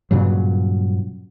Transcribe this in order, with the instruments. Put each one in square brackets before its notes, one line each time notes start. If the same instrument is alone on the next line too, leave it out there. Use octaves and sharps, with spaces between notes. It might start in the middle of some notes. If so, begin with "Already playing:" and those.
[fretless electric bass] G2 A#2 C#3 F#3